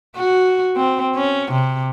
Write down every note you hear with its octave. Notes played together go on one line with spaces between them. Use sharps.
F#4
C4
C#4
C3